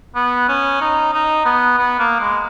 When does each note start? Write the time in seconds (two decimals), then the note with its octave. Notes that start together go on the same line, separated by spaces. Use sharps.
0.15 B3
0.48 C#4
0.81 D#4
1.13 D#4
1.45 B3
1.78 B3
1.99 A#3
2.20 G#3